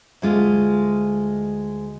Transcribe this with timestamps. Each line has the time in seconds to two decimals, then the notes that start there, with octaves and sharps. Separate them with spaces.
0.22 D2 G#3 F4